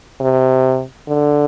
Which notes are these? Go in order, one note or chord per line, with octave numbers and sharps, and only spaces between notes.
C3
D3